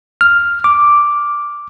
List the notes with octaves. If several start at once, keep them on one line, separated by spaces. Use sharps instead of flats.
F6
D6